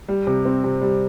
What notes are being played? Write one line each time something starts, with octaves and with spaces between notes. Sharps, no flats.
G3
C3
C4
C3
G3